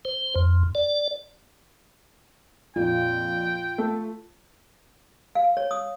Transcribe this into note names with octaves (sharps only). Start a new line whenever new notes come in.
C5
F2
D5
F2 A#2 F4 G5
A3 A4
F5
C#5
D#6